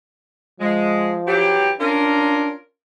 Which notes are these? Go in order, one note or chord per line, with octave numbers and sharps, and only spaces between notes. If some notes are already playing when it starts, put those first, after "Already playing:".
F3 G#3
E3 F#3 G4
C#4 D4 F4 A#4